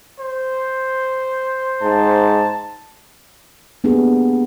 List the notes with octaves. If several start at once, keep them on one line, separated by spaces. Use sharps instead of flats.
C5
G#2 A5
A#3 B3 D4 G4 G#4